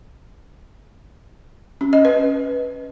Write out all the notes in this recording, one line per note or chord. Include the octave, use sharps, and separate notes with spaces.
C#4
D#5
B4